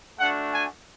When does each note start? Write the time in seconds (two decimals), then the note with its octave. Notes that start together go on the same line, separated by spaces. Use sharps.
0.19 A3 D4 F#4 F#5
0.53 G#5